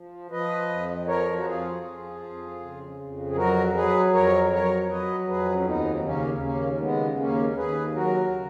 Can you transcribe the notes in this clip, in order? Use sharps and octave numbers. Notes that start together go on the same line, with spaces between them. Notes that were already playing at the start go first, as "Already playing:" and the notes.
Already playing: F3
F3 B4 D#5
F2
F3 A#4 C#5
F#4
F2 F4 G#4
F3
F2
C#3
F2
G#4
F#3 F#4 A#4
F#3 G#4 B4
F2 A#4 C#5
F#3 A#4 C#5
F#3 B4 D#5
F2 G#4 B4
C#4
D#2 B3 D#4
C#3 A#3 C#4
D#2 A#3 C#4
C#3 G#3 B3
D#2 A#3 C#4
D#2 G#4 B4
F#3 F#4 A#4
C#3